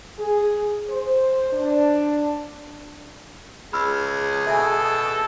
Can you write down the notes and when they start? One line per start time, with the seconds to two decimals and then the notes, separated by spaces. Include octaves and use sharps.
0.18 G#4
0.88 C5
1.53 D4
3.73 C#2 G#4 B5 E6 F6
4.47 B2 A4 E5 G#5